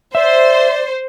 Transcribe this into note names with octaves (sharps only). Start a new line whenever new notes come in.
C5 D5 E5